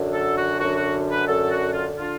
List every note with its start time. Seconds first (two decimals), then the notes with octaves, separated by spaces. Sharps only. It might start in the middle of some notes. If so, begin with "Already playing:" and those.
Already playing: F#2 D3
0.13 A4
0.37 F#4
0.59 F#2 D3 F#4
0.76 F#4
1.11 B4
1.27 F#2 D3 A4
1.50 F#4
1.73 F4
1.98 D3 F4